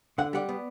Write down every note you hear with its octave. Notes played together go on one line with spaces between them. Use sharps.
D3 F#5
G3 D5 F#5
B3